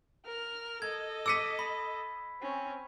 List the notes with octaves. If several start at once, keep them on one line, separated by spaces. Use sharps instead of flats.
A#4 F6
A4 D#5 G#6
D6 E6 B6 C#7 D#7
B5
C4 C#4